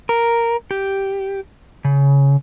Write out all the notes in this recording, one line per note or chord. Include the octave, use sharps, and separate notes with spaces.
A#4
G4
C#3